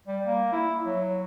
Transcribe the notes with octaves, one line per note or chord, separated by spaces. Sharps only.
G3
A#3
E4
F#3